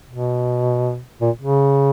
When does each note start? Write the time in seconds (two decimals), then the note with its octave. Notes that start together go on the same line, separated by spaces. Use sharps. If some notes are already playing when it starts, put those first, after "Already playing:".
0.10 B2
1.21 A#2
1.41 C#3